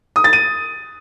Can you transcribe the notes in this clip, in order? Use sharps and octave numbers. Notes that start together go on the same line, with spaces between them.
D#6
A6
D#7